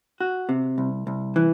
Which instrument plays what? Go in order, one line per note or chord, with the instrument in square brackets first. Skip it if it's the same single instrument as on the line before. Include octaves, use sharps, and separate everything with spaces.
[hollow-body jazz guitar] F#4
C3
C2
C2
E3